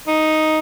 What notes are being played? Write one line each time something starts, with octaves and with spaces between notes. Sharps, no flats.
D#4